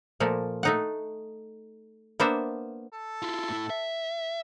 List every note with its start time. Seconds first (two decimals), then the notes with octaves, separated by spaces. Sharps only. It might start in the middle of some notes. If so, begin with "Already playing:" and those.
0.20 A#2 F3 A3 A#3
0.63 A3 D#4 F#5
2.20 A#3 B3 D4 C5 E5
2.93 A4
3.22 E4 F4
3.50 A2 E4
3.70 E5